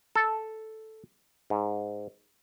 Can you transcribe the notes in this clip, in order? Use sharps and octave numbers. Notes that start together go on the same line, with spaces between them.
A4
G#2